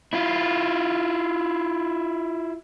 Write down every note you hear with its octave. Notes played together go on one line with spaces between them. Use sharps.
E4 F4